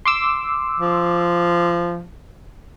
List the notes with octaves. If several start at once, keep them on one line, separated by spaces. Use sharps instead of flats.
C6 D6 E6
F3